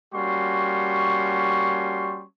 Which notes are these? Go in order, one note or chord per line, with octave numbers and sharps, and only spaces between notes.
G3 A#3 C#4 F#4 C6 C#6